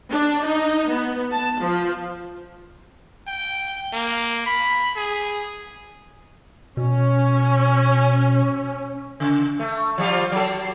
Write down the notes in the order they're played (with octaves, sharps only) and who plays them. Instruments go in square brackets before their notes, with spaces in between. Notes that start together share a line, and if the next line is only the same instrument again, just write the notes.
[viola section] D4
D#4
B3
A5
F3
[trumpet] G5
A#3
B5
G#4
[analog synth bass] B2 [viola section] C#4
[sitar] C#3
A3
F3 G3 F4
F#3 A4